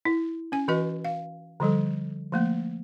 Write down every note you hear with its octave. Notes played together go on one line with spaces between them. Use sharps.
E4
C#4 G#5
E3 F#4 B4 D#5
F5
D3 F3 G3 A4
F3 A3 A#3